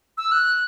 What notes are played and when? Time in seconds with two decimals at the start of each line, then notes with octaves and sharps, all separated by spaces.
0.17 E6
0.32 F#6